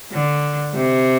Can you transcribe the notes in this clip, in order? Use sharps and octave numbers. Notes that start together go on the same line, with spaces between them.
D3
C3